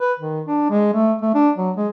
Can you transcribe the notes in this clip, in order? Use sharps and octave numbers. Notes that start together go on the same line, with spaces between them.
B4
D#3
D4
G#3
A3
A3
D4
F#3
G#3